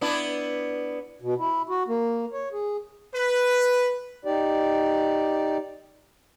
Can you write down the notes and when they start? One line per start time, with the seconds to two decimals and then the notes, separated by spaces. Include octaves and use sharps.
0.01 B3 D4 E4
1.22 B2
1.39 E4
1.69 F#4
1.88 A#3
2.33 C#5
2.53 G#4
3.14 B4
4.25 D#4 G4 D5